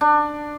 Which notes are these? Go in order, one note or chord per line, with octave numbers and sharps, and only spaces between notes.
D4